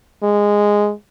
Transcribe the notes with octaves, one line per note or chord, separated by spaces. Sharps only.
G#3